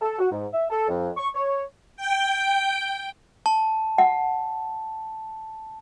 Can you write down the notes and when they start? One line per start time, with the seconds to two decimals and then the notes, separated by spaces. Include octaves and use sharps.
0.01 A4
0.19 F#4
0.31 G#2
0.52 E5
0.70 A4
0.88 F2
1.17 C#6
1.35 C#5
1.97 G5
3.46 A5
3.98 F#5